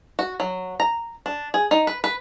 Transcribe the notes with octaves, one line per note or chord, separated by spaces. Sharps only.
F#4
F#3
A#5
D4
G#4
D#4
B4
B4